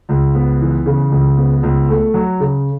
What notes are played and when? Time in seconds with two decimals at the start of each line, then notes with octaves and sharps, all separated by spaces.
0.09 C#2
0.35 B3
0.61 E3
0.86 C#3
1.11 C#2
1.37 B3
1.63 C#2
1.88 A3
2.14 F#3
2.40 C#3